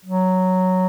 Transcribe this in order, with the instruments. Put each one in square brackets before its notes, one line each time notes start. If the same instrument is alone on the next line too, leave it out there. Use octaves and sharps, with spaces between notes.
[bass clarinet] F#3